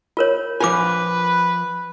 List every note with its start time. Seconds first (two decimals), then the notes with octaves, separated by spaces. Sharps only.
0.17 F4 A#4 C#5
0.61 F3 F4 A#4 B4 G#5 D6